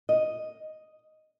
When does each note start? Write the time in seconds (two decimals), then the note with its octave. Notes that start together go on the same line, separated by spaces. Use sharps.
0.09 D#5